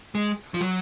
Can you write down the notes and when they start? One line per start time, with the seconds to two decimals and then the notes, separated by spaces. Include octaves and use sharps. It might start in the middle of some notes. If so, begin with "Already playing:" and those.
0.15 G#3
0.54 F3
0.61 F#3